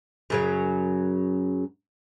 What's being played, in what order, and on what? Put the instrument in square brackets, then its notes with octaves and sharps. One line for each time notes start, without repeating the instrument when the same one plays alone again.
[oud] F#2 C#3 F#3